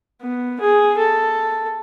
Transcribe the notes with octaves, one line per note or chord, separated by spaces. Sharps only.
B3
G#4
A4